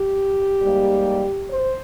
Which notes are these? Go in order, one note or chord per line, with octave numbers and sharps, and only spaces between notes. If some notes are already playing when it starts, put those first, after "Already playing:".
Already playing: G4
G#2 G3 A#3
C5